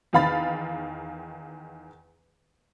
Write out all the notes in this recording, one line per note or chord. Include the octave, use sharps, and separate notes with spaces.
E2 D#3 F5 B5 A6